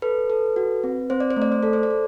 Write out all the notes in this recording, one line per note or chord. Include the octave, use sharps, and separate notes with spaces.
A4 B4
A4
F#4
C4
C4 C5
D5
C5
A3
D5
C5
A4 D5
C5
D5
A4